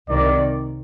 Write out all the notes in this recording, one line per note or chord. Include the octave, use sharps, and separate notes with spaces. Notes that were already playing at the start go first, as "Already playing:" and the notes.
C2 C3 D#3 D5